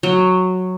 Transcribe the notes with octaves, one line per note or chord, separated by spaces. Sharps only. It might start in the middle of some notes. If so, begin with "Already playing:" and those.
F#3